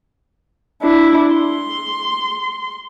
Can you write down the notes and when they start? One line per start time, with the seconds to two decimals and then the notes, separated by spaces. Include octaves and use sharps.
0.82 D4 E4
1.34 C6